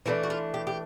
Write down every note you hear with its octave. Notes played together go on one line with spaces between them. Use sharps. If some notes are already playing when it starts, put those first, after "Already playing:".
E3 A3 D4 E4
F#4
F4
G4
G4